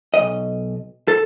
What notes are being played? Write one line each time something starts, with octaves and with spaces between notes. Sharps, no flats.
B1 D#5
A4